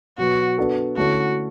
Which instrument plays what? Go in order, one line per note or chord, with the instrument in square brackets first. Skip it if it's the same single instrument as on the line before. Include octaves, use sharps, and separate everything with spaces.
[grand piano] B2 F#3 B3 [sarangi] F#4
[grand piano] B3 D4 F#4 A4
[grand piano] D3 A3 C#4 E4 A4 [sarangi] F#4